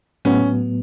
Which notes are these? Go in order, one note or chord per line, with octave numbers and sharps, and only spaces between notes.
A2 F#3 B3 C#4